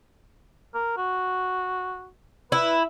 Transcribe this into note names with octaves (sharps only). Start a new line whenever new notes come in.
A#4
F#4
E4 B4